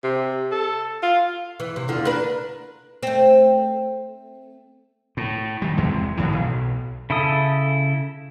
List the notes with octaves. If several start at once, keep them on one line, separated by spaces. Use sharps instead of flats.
C3
A4
F4
E3
C3
E2 D3 F4
D4 A#4 B4
A3 C4
A2
D#3 G3
E2 C3 G#3
G#1 A2 D#3 E3
B1
C#3 E4 A4 D#6